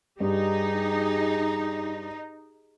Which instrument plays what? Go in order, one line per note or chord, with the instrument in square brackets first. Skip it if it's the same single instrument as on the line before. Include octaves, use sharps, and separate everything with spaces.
[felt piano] G2 [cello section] D#4 [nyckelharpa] G4 G#4